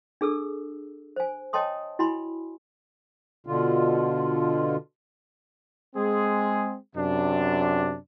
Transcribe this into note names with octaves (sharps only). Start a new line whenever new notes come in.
D4 G#4 A4 E6
C5 G#5
C#5 D#5 G5 A5 C6 D#6
E4 F#4 G#5 B5 C6
B2 D3 F4
G#3 C4 G#4
F#2 C3 D4